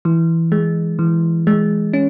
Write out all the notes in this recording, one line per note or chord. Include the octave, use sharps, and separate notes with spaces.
E3
G#3
E3
G#3
C#4